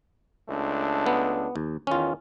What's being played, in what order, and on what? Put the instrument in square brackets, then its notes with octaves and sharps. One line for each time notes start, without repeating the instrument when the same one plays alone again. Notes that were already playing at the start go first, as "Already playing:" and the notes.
[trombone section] C#2 A3 D4
[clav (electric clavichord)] B3
D#2
[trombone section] E2 D#3 [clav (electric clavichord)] C#4 F4